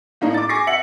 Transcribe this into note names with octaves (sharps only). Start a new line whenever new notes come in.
A2 A#3 D4 D#4
D6 A6
G#5 C#6 D6 A#6 C7
E5 F#5 C#7 F#7